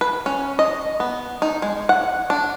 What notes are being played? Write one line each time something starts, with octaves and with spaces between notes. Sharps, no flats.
B4
C#4
D#5
B3
D#4
G#3
F#5
D4